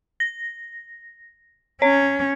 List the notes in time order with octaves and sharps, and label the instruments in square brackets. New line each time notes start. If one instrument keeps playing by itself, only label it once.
[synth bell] A#6
[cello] C#4 [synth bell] C#5